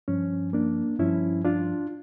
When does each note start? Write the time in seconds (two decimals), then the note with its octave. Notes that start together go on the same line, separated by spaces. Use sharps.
0.08 G2 F3 C#4
0.53 A#3 D4
0.99 G2 F3 C#4 E4
1.45 D4 F4